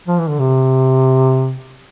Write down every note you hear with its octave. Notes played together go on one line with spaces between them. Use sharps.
F3
E3
D3
C3